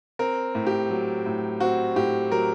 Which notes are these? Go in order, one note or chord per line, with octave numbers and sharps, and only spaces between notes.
C4 A#4
A2
G4
F#3
A2
C4 F#4
A2 G4
F#3 A#4